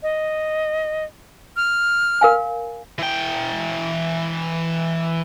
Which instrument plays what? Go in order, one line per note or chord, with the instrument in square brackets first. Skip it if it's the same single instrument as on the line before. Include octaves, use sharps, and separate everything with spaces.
[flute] D#5
F6
[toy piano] A#4 F5 G#5
[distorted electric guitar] E3 G5